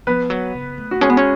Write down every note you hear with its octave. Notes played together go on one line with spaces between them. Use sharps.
F3 B3 B4
F#3
C#3
A3
F#4
G#3 C#4 G#4
B3
C#4